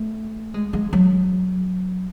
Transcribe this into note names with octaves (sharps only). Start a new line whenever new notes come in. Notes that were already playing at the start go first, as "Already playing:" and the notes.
Already playing: A3
G#3
G#3
F#3